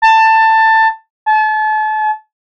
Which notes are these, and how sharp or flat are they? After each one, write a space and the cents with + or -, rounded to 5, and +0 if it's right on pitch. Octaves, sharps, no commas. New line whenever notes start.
A5 +15
A5 -35